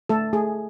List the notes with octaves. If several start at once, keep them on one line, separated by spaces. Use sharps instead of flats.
A3 A4
A3 G#4